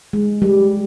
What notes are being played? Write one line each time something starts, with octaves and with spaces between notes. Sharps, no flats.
G#3
G3